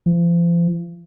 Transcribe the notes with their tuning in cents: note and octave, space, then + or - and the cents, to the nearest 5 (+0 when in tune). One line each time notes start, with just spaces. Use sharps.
F3 -40